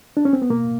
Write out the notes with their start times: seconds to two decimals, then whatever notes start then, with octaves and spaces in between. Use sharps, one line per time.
0.17 D4
0.25 C#4
0.33 C4
0.42 B3
0.50 B2 A#3